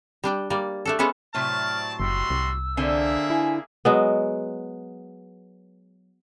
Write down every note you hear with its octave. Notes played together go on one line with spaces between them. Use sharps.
G3 D4 G5
G3 A#3 D5
A3 D4 A4
G#3 B3 C#4 A4 B4
A2 C3 F#3 C4 D5 A5 F6
F#1 G3 F#4 C6 E6
C2
D3 A#3 C4 G#4 E5
E4 G#5
F#3 G#3 B3